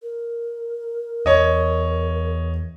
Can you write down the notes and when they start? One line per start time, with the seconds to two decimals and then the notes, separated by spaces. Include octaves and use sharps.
0.03 A#4
1.26 E2 C#5 D#5